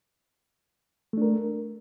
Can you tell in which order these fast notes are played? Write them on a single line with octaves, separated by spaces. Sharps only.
A3 D4 A#4